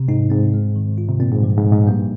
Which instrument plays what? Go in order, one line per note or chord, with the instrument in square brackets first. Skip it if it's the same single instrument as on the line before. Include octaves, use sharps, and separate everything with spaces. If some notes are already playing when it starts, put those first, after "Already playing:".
Already playing: [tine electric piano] C3
[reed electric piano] G#2 [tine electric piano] D#4
[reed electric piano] G#2 [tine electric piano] C4
[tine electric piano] G#3
D#3
F4
[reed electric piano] C3
[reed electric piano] A#2 [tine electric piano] C4
[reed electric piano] G#2
[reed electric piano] G2 [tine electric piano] F3
[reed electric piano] G#2
[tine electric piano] A#2
[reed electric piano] G#2
[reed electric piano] G2 [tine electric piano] A#3